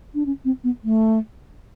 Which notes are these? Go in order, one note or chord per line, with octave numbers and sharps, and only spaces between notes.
D4
C#4
C4
B3
A3